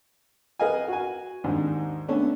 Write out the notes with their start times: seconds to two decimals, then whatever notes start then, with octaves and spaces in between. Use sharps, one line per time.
0.59 A#4 B4 D#5 F5 G#5
0.88 F#4 G#5
1.44 D#2 G#2 D4
2.08 A3 B3 C#4 D4 A4